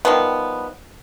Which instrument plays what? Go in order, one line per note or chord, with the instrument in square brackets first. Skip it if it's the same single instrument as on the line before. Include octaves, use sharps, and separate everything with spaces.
[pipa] D#3 F3 G3 B3